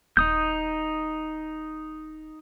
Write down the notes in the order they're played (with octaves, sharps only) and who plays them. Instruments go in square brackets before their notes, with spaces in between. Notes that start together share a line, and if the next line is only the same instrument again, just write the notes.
[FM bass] D#1 [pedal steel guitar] D#4 D#6 G6